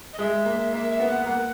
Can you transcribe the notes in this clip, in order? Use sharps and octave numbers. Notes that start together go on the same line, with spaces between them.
D#5
G#3 E5
A#3
A#3 E5
E5
B3
F#5
A#3 F#5